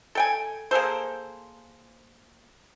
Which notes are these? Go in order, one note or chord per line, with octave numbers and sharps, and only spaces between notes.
A4 G5 G#5
A#3 G#4 A4 C5